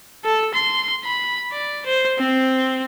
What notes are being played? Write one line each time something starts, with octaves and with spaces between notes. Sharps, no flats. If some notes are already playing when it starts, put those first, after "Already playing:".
A4
C6
B5
D5
C5
C4